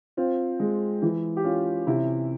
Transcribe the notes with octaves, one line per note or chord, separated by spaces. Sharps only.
C4 F4
G#3
E3
G4
C#4 F4
C3 E4